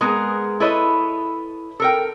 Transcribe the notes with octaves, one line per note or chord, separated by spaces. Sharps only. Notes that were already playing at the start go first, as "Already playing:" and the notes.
G#3 B3 G#4 A#4
E4 A4 B4 C#5 D#5
A4 A#4 G5